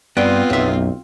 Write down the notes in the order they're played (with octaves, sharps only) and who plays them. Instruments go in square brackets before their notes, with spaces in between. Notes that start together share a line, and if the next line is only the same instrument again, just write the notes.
[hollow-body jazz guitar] G2 F#5 G5 [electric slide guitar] B3 [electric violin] C4 F4
[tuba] B1 [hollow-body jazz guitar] F#2 E5